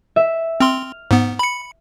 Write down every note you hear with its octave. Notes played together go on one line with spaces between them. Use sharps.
E5
C4 C6 F6
G#2 B3
B5 C#7